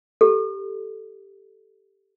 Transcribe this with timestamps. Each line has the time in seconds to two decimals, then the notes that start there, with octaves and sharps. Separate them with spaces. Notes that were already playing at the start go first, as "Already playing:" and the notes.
0.21 G4 A4